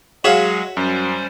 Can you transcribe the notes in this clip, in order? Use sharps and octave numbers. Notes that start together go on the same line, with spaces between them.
F#3 G#3 F#4 G#4 C#5 E5 F5
F#2 G3 C#4 C5